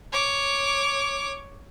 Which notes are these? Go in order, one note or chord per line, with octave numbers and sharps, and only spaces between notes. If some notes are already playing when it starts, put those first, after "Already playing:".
C#5 D6